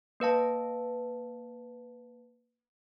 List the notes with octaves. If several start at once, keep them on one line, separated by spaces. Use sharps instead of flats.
A#3 B4 F5 A5